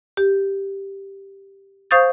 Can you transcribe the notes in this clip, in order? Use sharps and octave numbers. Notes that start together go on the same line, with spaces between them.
G4
C5 F5 C#6 D#6 G6 A6